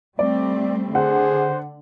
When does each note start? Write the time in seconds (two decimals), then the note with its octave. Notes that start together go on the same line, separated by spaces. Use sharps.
0.19 G3 A3 C4 D5
0.95 D3 G#4 C5 F#5